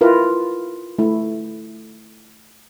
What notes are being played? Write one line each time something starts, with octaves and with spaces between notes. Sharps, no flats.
E4 F4 A#4 B4
A3 E4